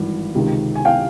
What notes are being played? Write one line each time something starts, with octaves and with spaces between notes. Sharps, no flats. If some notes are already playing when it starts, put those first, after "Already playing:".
Already playing: G#1 G2 E3
C#2 C3 D#3
G#5
F5 G5